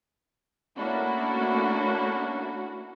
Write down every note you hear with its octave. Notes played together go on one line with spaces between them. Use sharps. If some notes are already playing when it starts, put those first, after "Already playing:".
A3 A#3 C#4 D4 E4 F#4